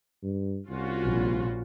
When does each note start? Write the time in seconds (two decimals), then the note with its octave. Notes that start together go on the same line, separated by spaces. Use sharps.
0.23 G2
0.70 C2 C#4 F4 F#4
1.05 A#1